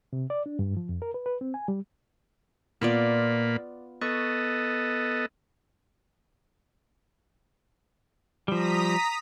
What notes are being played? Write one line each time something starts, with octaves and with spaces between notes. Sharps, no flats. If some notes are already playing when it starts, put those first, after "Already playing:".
C3
D5
D4
G2
F3
F2
A#4
B4
B4
C4
G#5
G3
A#2 A#3 B3 F4 D5 B5
B3 A4 D#5 C#6
F3 G3 A#5 D#6 B6